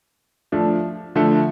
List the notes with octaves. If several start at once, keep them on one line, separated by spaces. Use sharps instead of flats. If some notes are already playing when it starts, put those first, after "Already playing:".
F3 A3 D4
D3 F3 A3